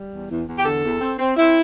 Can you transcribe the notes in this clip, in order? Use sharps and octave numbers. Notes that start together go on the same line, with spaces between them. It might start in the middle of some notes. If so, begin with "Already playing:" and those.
Already playing: G3
E2
E2
E2
G4
D3 A4
E2
C4
C4
C4 E4